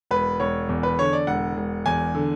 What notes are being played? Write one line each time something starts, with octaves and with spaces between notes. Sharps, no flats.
E1 B4
E1 C#5
E2
B4
D3 C#5
D5
E1 F#5
E1
E2 G#5
D3